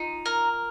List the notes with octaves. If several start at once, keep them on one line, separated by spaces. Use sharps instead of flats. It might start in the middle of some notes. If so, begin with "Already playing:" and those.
Already playing: D#4 F4
A#4